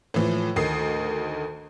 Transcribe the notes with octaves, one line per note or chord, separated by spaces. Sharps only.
A2 E3 F3
D2 D#3 D#6 C7